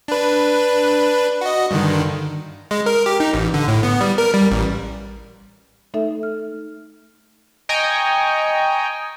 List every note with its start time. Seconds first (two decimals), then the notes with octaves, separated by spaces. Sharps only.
0.08 D4 B4
1.41 F#4 D#5
1.71 G2 D3 D#3
2.71 G#3
2.86 A#4
3.06 G4
3.20 D#4
3.33 A1
3.54 D3
3.68 A2
3.83 B3
4.01 G3
4.18 A#4
4.34 G3
4.51 A1
5.94 A3 D#4 A4 E5
6.23 F6
7.69 D#5 G5 G#5 A#5 C#6